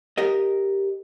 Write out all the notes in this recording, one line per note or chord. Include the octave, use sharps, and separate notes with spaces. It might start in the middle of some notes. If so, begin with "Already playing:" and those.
G4 A#4 D#5